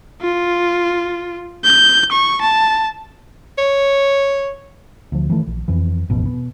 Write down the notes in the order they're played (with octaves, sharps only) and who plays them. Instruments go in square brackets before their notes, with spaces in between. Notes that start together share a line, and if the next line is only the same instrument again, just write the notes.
[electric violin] F4
G6
C#6
A5
[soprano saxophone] C#5
[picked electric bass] D2 F3
D#3 E3 A3
A#1
F2 E3
D1 A1 F2 B2
B2